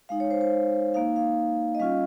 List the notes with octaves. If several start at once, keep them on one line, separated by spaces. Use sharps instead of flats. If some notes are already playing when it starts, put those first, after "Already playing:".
G#3 D#4 F5
C#5
C5
C5
A#3 D#4 F5
F5
D#5
G3 C#4 F4 F5